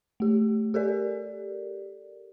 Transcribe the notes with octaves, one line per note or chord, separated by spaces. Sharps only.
A3 G4
G4 A4 A#4 D5